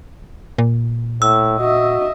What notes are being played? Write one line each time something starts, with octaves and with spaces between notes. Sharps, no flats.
A#2
A2 E6
F#4 D#5 E5